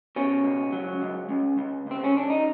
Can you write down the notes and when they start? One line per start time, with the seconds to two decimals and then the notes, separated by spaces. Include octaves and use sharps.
0.16 B2 C#4
0.44 C#2
0.73 F#3
1.02 C#2
1.29 C#2
1.58 C#2
1.87 C#2 C4
2.04 C#4
2.15 C#2 D4
2.30 D#4